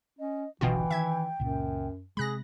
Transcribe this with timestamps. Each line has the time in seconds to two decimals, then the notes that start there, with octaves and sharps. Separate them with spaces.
0.19 C#4 D#5
0.61 D1 G#1 B2 D3 E3 B3 F4 G5
0.91 D#3 E5 G#6
1.40 C#2 F#2 A#2
2.17 C3 G#3 G#4 B5 F#6 A#6